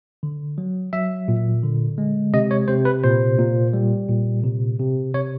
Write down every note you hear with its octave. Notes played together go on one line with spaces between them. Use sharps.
D3
F#3
F#3 E5
A#2
D3
G#3
C3 D#5
C#5
C3 C5
B4
A#2 C5
A#2
G3
A#2
C3
C3
C3 C#5